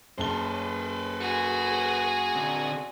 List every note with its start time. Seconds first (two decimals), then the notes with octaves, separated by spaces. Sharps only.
0.18 F#1 B4 C5 A5 G7
1.20 F#4 G#4
2.35 D3 C4